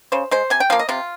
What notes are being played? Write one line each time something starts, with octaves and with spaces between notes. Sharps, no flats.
C#3 C5
G#3 C5
C3 G#5
G5
F3 A#3 F5
D#5
C3 F4